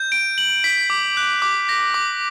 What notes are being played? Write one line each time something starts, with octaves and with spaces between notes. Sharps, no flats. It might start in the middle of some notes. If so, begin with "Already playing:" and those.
Already playing: G6
D7
F#7
B6
D6
F#6
D6
A#6
D6